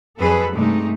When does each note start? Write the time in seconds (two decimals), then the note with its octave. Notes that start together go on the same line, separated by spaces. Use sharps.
0.19 F2 F#3 G#4 A4 B4
0.51 G2 C3 G#3 A3 D#4